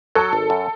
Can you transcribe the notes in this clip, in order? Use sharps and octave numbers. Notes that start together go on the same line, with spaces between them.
F#3 A4
G#1
F#2